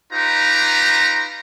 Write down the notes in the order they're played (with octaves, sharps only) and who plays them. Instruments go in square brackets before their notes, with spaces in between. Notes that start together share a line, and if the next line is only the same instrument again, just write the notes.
[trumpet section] D#4 F4 G4 B4 A#5